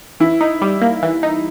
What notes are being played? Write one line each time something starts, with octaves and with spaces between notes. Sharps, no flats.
E3 E4
D#4
G3
A#3
E3
D#4